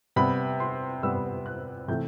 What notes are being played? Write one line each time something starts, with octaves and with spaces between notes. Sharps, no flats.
C3 G3 B3 B5
C6
C3 G3 B3 E6
F#6
C3 E3 A3 G6